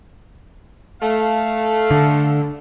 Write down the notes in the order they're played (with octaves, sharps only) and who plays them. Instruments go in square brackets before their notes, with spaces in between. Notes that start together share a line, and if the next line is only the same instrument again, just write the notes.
[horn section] A3 F5
[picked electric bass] D3